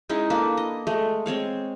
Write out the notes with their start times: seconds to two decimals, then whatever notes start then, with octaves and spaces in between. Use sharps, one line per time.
0.09 G#3 C#4 D#4 E4
0.30 A#3 D4 A4 B4
0.57 D#5
0.87 G#3 A3
1.26 G#3 C4 C#5 F5